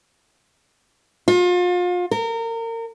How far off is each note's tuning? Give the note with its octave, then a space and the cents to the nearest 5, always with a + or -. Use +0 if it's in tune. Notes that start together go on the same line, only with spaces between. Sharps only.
F4 +35
A#4 -30